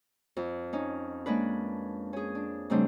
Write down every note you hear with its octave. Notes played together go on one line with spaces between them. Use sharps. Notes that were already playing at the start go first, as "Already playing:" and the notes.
F2
C#4 D#4
G#3 A#3 C#4 D4 B4
C#4 G#4
D4
G#2 C#3 G3 A3 C4 D4